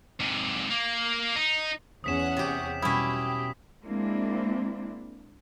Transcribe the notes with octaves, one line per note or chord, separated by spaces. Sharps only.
G#2 C3
A#3
D#4
E2 C#4 F#5 D#6 B6 E7
C3 G4
B2 G3 B3 C#4 E4 G4 D#6 B6
G#3 A#3 C4 D4 E4